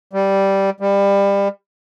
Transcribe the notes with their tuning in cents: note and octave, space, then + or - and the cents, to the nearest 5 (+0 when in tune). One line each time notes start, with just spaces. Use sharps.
G3 -5
G3 +25